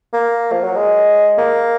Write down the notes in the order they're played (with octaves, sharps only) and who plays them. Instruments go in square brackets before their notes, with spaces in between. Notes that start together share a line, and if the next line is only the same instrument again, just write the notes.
[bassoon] A#3
F3
F#3
G#3
A#3